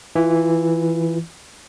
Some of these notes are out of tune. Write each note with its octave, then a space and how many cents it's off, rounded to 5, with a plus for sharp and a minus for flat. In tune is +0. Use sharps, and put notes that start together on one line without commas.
E3 +0 F4 -20